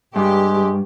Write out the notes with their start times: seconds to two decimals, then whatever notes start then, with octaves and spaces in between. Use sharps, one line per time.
0.16 G2 G#3 G4